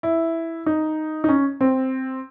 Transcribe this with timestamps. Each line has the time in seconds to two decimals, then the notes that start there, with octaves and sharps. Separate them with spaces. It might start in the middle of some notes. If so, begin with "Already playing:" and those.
0.03 E4
0.66 D#4
1.24 D#4
1.29 C#4
1.61 C4